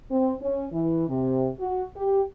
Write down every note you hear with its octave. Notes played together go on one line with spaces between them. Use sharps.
C4
C#4
E3
C3
F#4
G4